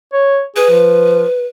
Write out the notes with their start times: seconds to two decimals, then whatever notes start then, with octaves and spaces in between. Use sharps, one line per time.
0.13 C#5
0.56 G#4 B4
0.70 F3